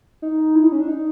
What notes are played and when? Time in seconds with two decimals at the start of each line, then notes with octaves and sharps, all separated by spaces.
0.22 D#4
0.56 E4
0.64 D#4
0.72 C#4
0.80 D4
0.88 D#4